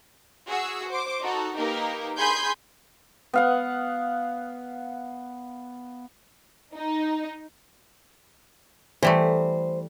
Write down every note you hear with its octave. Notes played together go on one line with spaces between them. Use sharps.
F#4 G#4 E6
C5 D6
D#4 F#4 A4
A#3 D#4 G4 A#4 B4
G#4 G#5 B5 C6 G6
B3 F5 F#5
D#4
E3 G3 A3 C5